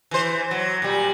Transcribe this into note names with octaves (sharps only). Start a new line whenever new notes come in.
E3 C5
F#3
A#2 G3